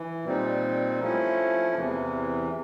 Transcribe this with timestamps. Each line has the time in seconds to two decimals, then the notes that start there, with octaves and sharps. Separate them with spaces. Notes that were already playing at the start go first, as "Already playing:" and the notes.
Already playing: E3
0.24 A#2 G3 C4 D#4
1.00 F3 A3 C#4 E4
1.76 E2 C3 E3